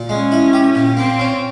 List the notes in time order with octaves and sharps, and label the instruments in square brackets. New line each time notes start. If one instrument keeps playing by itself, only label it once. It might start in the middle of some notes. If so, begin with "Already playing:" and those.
Already playing: [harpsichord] A#2
[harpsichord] G#3 [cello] C#4
[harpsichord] E4
G4
A#2
[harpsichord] A#3 [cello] C4
[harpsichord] C#4